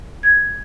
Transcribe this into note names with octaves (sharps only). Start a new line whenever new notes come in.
G#6